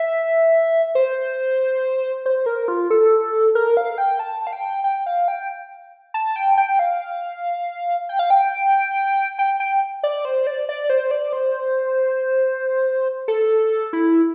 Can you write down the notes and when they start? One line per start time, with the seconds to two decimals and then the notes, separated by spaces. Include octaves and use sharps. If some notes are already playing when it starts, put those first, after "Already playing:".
Already playing: E5
0.95 C5
2.26 C5
2.46 A#4
2.68 F4
2.90 A4
3.55 A#4
3.77 F5
3.98 G5
4.20 A5
4.47 F5
4.53 G5
4.84 G5
5.06 F5
5.28 G5
6.14 A5
6.36 G5
6.58 G5
6.79 F5
8.09 G5
8.19 F5
8.30 G5
9.39 G5
9.60 G5
10.03 D5
10.25 C5
10.47 D5
10.69 D5
10.90 C5
11.11 D5
11.33 C5
13.28 A4
13.93 E4